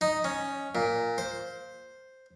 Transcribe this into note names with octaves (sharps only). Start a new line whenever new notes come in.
D#4
C#4
A#2
C5